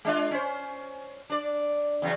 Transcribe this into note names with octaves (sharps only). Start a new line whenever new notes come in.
G#3 D4 F4
C#4 C5
D4 D5
E2 C#3 F#3